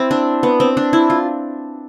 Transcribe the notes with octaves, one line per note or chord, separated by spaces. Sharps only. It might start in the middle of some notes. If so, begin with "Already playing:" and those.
Already playing: C4 E4
D4
B3
C4
D4
E4
F4